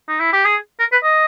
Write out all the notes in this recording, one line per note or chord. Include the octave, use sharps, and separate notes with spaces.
D#4
E4
G4
G#4
A#4
B4
D#5